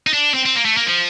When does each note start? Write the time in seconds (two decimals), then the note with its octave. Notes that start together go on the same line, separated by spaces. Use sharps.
0.07 D#4
0.13 D4
0.34 C4
0.45 C4
0.56 A#3
0.65 A3
0.77 A#3
0.87 F3